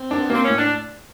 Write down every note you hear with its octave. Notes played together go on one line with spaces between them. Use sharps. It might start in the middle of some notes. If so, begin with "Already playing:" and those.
Already playing: C4
A#3 D4
B3
A#3 C4
A2 C#4
D4